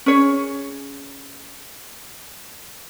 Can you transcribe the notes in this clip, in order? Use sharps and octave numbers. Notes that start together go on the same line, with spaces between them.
C#4 G#4 C#5